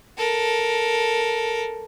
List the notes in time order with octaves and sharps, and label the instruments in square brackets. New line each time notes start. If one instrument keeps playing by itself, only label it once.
[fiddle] A4 A#4